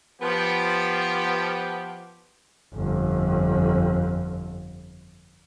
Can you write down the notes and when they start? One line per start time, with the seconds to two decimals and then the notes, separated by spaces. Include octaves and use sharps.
0.21 F3 B3 G4
2.74 G1 F2